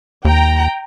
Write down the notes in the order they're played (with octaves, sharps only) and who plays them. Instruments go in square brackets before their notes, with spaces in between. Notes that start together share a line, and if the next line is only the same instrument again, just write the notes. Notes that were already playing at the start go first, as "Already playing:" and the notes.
[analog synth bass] D#2 [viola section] G5 A#5